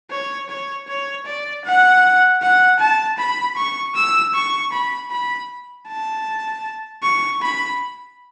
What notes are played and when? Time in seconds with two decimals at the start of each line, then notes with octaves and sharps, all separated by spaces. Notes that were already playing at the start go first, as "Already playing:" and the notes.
0.11 C#5
0.49 C#5
0.88 C#5
1.26 D5
1.64 F#5
2.42 F#5
2.80 A5
3.18 B5
3.57 C#6
3.95 E6
4.34 C#6
4.72 B5
5.11 B5
5.88 A5
7.03 C#6
7.42 B5